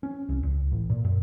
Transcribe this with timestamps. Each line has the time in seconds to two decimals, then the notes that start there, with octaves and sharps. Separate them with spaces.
0.03 C#4
0.29 C2
0.43 C#2
0.72 A1
0.90 A#2
1.04 F#2